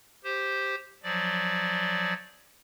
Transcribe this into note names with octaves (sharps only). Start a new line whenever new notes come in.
G4 C5
F3 F#3 D5